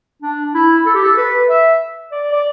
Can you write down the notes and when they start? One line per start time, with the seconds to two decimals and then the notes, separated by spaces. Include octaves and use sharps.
0.22 D4
0.54 E4
0.86 A4
0.95 G4
1.04 A4
1.17 B4
1.49 E5
2.12 D5
2.32 D5